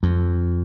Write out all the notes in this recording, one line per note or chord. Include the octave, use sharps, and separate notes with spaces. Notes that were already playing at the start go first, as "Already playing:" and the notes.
F2